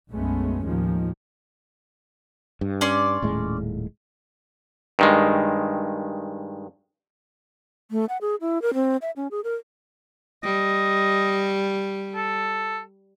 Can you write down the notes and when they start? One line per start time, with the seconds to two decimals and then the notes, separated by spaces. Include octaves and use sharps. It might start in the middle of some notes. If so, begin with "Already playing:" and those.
0.12 B1 F#2 G#3 A3 B3 C#4
0.64 D#2 A2 D#3 F3 G#3
2.61 G2
2.81 C#4 D5 C6
3.22 D#1 A2 G#3
4.99 G2 D#3 G#3
7.91 A3
8.09 F#5
8.21 G#4
8.41 E4
8.62 A#4
8.74 C4
9.02 E5
9.16 C#4
9.31 G#4
9.44 A#4
10.43 G3 D#5
12.15 A4